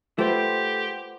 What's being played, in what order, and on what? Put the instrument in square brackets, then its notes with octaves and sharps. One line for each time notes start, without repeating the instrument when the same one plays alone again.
[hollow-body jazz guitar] A3 [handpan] F4 B4 C5 [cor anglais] G4 [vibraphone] F#5 G5 C6